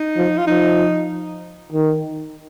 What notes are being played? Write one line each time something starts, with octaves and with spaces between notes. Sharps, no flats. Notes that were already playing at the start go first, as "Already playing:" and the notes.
Already playing: D#4
F3
F4
F3 D#4
D#3